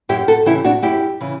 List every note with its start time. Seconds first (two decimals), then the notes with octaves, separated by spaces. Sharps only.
0.09 F#2 E4 G4
0.28 F#4 A4
0.46 C#3 E3 E4 G4
0.65 D4 F#4
0.83 F#2 E4 G4
1.21 C#3 E3